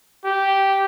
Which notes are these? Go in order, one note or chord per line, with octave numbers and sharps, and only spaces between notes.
G4